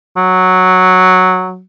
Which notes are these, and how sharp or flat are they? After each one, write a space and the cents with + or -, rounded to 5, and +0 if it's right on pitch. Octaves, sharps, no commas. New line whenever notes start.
F#3 -5